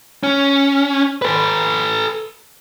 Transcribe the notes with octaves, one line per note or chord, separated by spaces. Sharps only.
C#4
A4 B4